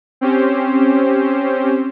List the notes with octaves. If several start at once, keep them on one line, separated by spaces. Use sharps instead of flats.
C4 C#4 G4 C5